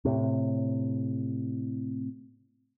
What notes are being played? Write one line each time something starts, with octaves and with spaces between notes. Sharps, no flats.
A2 C3